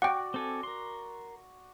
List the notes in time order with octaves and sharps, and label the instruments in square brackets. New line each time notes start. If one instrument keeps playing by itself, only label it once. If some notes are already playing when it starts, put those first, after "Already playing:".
[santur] F#4 D5 [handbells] F#5 G5
[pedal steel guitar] C4 A4 G#5
A#4 C6